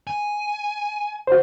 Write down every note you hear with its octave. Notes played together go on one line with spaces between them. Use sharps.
G#5
F#4 C5